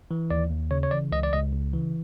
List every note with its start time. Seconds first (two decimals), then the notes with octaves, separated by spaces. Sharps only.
0.11 E3
0.31 D#2 D5
0.50 D#2
0.71 C#3 C#5
0.83 C#5
0.91 E3 D5
1.12 C#2 D#5
1.23 D5
1.33 C#2 D#5
1.53 C#3
1.73 E3